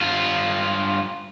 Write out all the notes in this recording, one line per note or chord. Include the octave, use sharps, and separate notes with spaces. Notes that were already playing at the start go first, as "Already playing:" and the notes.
G2 F4